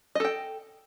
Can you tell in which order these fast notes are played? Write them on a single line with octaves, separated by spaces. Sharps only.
D#5 A4 G5